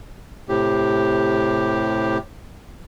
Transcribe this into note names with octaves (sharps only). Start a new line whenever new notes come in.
A2 C3 G4